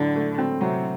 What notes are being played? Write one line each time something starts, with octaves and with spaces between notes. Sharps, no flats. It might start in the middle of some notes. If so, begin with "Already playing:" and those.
Already playing: A2 D3 F#3
A3
C4
C3 F#3